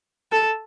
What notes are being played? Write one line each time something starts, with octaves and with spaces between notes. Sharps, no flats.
A4